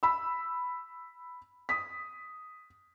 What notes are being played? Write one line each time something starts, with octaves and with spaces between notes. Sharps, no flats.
B5 E6
D#6 B6